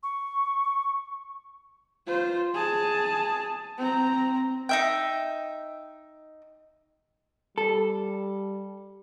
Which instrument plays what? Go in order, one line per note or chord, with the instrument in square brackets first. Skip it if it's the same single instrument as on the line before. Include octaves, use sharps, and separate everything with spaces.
[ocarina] C#6
[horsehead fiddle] F4 C5
G#4 A5
C4 A#5
[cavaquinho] D#4 E5 G5
[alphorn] G3 [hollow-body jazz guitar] A4